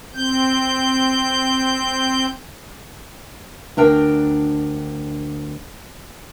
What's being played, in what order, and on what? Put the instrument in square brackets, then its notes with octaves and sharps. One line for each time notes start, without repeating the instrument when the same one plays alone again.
[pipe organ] C4 G6
[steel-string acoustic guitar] D2 D4 A#4 G5